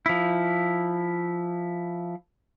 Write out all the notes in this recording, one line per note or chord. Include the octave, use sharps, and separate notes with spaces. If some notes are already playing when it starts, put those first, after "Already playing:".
F3 E4